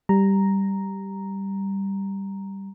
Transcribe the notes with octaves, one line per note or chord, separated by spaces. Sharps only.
G3 A#5